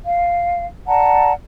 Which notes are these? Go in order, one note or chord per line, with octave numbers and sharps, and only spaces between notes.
F5
D5 F#5 A5 A#5